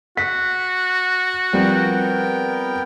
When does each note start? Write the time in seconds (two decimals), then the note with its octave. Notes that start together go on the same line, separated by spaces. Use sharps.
0.17 F#4 B6
1.53 F3 G3 B3 C4 A#4 G5